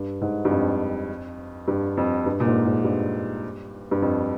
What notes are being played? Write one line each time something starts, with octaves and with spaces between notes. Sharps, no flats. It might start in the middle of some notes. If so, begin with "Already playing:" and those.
Already playing: G2
G#2
G2
F2
G2
F2
G2
A#2
G#2
G#2
G2
G2
F2